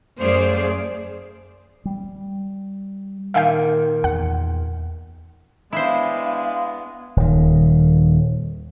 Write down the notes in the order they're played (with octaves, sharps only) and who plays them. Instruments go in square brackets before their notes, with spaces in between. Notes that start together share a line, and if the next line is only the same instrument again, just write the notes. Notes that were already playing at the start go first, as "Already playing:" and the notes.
[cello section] F#2 A3 G#4 C5 D5 F5
[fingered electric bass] G3
[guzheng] A#2 D#3 [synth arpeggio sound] E5 F5 G5
[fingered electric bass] E2 [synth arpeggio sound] F#5
[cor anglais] G#3 [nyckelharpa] B3 D4 [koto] E4 C5 [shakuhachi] F5
[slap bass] D#1 D#3